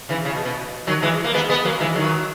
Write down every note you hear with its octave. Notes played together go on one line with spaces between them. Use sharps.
C#3 E3
C#3
B2
B2
D#3 F#3
E3 G#3
A#3
G#3 B3
G#3 B3
F#3 A#3
E3 G#3
D#3 F#3